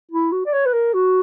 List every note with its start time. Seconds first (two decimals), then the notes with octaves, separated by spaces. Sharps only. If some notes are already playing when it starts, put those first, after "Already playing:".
0.11 E4
0.32 F#4
0.45 D5
0.53 C#5
0.66 B4
0.73 A#4
0.94 F#4